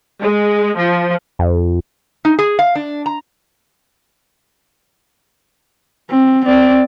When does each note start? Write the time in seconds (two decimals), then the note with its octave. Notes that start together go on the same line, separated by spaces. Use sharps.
0.22 G#3
0.76 F3
1.39 F2
2.25 D#4
2.39 G#4
2.59 F5
2.75 D4
3.06 A#5
6.10 C4
6.46 C4 D5